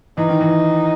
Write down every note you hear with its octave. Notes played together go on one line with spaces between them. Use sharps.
E3 D#4
D#3
E3